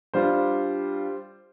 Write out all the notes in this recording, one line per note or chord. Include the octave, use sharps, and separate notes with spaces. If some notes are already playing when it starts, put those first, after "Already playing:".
G3 D4 F4 C5